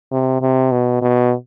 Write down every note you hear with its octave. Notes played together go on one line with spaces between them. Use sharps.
C3
C3
B2
B2